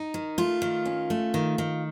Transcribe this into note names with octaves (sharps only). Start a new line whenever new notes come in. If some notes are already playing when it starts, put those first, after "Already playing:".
Already playing: D#4
D#3
A3 F4
D#3
C#4
A3
D#3
D#3